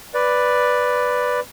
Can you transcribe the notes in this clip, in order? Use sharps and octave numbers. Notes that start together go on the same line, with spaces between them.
B4 D5